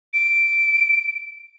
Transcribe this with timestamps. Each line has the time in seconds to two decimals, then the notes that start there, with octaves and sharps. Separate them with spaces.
0.13 D7